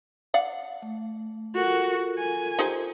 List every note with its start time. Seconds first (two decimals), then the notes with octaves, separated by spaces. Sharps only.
0.34 D5 F5 F#5
0.82 A3
1.55 F4 F#4 A4 A#4
2.19 G#5
2.59 D#4 G4 C5